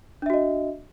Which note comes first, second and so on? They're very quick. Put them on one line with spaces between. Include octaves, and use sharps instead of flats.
D4 E5 F#4 D#5